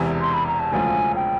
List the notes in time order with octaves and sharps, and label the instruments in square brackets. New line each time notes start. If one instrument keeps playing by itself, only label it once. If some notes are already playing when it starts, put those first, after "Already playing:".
Already playing: [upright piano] E1 E2 C3 E3
[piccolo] C6
B5
A#5
A5
[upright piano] E1 D2 C#3 F3 [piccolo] G#5
[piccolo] G5